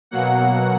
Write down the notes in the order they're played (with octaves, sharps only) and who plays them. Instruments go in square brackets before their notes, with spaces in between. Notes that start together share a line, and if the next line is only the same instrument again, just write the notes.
[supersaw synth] B2 F#3 A#3 F#5